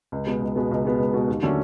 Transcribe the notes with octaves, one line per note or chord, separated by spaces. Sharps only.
C#2
B2 G#3 B3
C#2
B2 G#3 B3
C#2
B2 G#3 B3
C#2
B2 G#3 B3
D#2
D3 F#3 A3 C#4